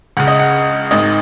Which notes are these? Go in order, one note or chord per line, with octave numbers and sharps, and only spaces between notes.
C#2 C#3 F#5
D#5
F#5
G#1 G#2 D#3 D#5